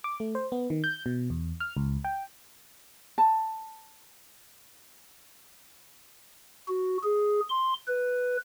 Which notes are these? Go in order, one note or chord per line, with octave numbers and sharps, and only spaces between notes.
D6
A3
C5
B3
D#3
G6
B2
E2
F6
C#2
G5
A5
F#4
G#4
C6
B4